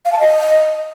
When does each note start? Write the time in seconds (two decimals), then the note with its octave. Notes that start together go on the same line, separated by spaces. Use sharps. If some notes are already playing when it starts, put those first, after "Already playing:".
0.05 F5
0.12 A5
0.19 D#5